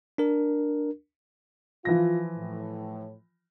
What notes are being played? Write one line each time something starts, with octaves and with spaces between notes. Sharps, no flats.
D4 A#4
E3 F3 F4 A#6
A2